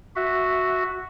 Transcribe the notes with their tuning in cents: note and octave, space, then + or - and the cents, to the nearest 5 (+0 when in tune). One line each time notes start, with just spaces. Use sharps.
F#4 +0 E5 +0